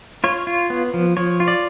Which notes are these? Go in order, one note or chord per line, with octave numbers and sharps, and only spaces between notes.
F4 C#5
F4
B3
F3
F3 C#5
F4
D5